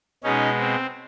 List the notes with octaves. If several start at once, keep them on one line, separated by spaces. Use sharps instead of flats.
B2 G#3 C#4 D#4
C4